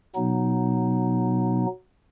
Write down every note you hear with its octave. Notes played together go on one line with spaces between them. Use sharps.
B2 F#3 B3 D#4